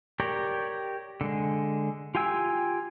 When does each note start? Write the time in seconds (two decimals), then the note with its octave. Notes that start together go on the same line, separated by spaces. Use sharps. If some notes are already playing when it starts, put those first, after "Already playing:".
0.20 G4 A#4 C#5 D5
1.21 D3 G#3
2.15 F4 G4 G5 G#5 E6